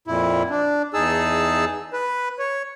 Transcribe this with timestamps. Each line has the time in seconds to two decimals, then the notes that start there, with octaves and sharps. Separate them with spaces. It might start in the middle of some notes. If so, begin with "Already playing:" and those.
0.08 F2 A#2 E4
0.50 D4
0.94 E2 D#4 G#4 A5 E6
1.93 B4
2.39 C#5